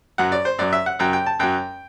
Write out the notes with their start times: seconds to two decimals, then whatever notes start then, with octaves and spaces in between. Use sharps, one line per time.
0.18 F#2 F#3 F#5
0.32 D5
0.45 C5
0.59 F#2 F#3 D5
0.73 E5
0.86 F#5
0.99 F#2 F#3 G5
1.13 G5
1.26 A5
1.39 F#2 F#3 G5